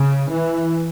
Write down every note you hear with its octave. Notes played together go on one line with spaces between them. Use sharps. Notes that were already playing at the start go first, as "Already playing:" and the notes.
Already playing: C#3
E3